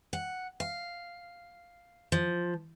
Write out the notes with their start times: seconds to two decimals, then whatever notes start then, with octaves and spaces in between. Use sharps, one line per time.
0.13 F#5
0.60 F5
2.12 F3